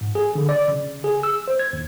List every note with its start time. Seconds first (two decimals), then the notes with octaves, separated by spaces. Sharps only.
0.01 G#2
0.15 G#4
0.35 D3
0.49 D5
0.68 C#3
1.04 G#4
1.23 E6
1.48 C5
1.59 G#6
1.73 D#2